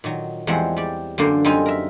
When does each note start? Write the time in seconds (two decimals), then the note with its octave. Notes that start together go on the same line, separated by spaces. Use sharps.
0.04 A#2 D#3 F#3
0.47 E2 F3 G3 G#3 C4 F#5
0.76 G3 D5
1.18 F#2 D3 A#3 D4 C5
1.45 F#2 G3 C4 D#4 F4 G#5
1.66 A#4 E5